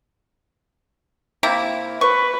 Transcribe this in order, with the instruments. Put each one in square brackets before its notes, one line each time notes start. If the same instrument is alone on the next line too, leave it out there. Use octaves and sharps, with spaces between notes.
[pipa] C3 A#3 E4
[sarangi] B4 [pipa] C#6